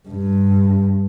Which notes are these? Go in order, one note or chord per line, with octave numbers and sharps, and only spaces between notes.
G2